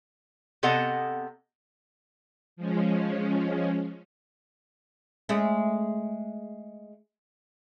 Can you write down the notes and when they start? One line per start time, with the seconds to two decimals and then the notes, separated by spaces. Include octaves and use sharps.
0.63 C3 B3 A4 D#5 F#5
2.57 F3 G#3 C#4
5.29 G#3 A3 C#4